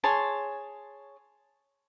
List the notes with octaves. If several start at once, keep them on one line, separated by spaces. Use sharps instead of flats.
G#4 C#5 A5 C6